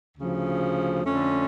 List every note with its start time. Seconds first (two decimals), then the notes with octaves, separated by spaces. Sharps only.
0.18 D2 C#3 F3
1.03 F2 D3 A3 C#4